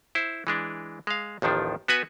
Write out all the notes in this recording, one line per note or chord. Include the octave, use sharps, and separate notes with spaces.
E4 C5
E3 G#3 D4
G#3 F5
A1 D#2 D#3 F3 D4
B3 F#4 B4 G#5